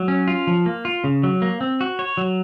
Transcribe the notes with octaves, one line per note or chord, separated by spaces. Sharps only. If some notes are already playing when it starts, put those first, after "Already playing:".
Already playing: F#3
C#4
F4
F3
A#3
F4
C#3
F#3
A#3
C4
F#4
C#5
F#3